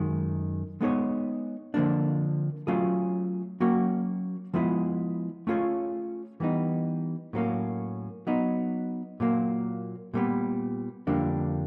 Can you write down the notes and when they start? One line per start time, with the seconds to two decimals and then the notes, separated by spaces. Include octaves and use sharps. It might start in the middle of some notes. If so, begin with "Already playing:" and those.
Already playing: F#2 D#3 G#3
0.81 G#3 B3 D#4 G#4 C#5
1.74 D3 F3 A#3 D4
2.67 F#3 A3 C#4 F4 G#4
3.60 F#3 A#3 C#4 F#4
4.54 F3 G#3 B3 E4 G#4
5.47 A3 C#4 F4 G#4 C#5
6.40 E3 G3 B3 D#4
7.33 A2 F#3 A#3 C#4
8.27 F#3 B3 D#4
9.20 A#2 F#3 A#3
10.14 A#2 G3 B3
11.07 F2 D3 G3 A#3 D4